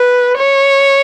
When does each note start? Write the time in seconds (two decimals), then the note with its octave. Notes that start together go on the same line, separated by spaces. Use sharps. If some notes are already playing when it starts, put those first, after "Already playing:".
Already playing: B4
0.38 C#5